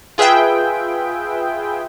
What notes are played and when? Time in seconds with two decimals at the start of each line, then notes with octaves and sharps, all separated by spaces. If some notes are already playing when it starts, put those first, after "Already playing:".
0.18 F4 G#4 B4 E5 G5